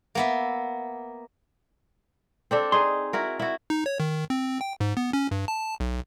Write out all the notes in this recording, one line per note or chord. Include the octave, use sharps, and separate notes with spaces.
A#3 B3 E5
C4 D4 A4
D#4 G#4 C6
E4 F#4 A#4
E4 F#4
D#4
C#5
D#3
C4
G5
G#2
B3
C#4
G2
A5
B1